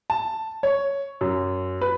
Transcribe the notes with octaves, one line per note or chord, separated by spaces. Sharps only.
A5
C#5
F#2
B4